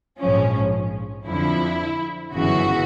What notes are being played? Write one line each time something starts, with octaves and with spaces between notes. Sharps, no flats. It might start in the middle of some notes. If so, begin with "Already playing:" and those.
A#1 G#2 F3 C#4
F2 D3 F3 E4
G1 F#2 C#3 E3 F#4